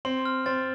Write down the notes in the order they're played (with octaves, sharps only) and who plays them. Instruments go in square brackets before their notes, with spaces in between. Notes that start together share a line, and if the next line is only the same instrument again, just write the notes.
[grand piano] C4 [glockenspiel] C6
[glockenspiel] F6
[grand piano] C4 [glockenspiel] A6